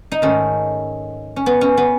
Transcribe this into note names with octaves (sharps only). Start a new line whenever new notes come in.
D#4
G#2 D#3 A3 C#4
C#4
B3
C#4
B3